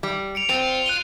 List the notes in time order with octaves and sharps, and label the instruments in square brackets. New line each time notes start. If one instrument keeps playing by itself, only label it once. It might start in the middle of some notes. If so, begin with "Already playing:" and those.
[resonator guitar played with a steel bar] G3
[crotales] C#7 D7 F7
[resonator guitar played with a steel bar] C4 [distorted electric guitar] F4
[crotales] F#6 D#7 G7